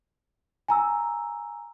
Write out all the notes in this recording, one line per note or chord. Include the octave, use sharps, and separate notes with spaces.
G#5 A#5 E6